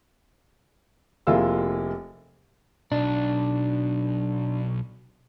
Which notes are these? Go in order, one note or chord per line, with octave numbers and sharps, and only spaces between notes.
F1 A#3 E4 F4 G#4 E6
B1 D4